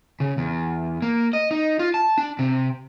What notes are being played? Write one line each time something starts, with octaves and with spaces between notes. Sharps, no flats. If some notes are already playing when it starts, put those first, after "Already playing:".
C#3
E2
A#3
D#5
D#4
F4
A5
D4
C3